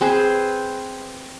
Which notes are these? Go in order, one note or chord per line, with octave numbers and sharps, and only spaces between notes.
C4 G#4 B4 C5